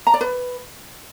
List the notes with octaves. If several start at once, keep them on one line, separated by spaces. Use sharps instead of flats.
A#5
D5
B4